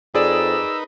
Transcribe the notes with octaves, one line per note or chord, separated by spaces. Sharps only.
F2 D#4 G#4 A#4 B4 D5 E6